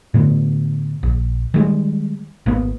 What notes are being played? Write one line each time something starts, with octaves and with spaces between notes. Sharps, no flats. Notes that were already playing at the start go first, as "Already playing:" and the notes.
A2 D3 B3
A#1
D#3 G3 G#3
G#1 A#3 B3